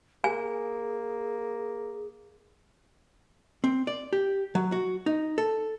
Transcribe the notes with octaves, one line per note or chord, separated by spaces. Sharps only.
A#3 G#4 G#5
C4
D5
G4
F#3
F#4
D#4
A4